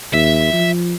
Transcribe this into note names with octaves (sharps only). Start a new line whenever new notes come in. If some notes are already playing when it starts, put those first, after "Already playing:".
D#2 E5
F3